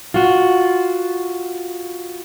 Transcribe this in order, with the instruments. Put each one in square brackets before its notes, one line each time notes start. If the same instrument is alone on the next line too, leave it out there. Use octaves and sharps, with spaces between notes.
[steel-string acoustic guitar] F4 F#4